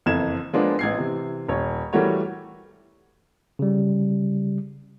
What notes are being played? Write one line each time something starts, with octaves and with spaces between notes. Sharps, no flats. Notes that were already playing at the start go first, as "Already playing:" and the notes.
F#1 F2 E3 A4 G#6 E7
F3 G#3 A#3 B3 D4
A1 G#6 C7
C3 E3
D#1 C#5
E3 G3 A3 F#4 A#4 C#5
C#3 G3